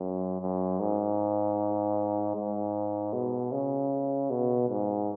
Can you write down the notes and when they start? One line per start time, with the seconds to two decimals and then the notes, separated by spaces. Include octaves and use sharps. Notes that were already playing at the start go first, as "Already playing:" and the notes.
Already playing: F#2
0.42 F#2
0.80 G#2
2.35 G#2
3.13 B2
3.52 C#3
4.30 B2
4.69 G#2